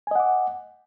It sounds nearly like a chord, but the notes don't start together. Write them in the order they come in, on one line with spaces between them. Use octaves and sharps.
G#5 D#5 F#5 D6